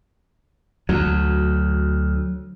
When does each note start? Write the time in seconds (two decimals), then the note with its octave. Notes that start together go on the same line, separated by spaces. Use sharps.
0.89 D2 F#3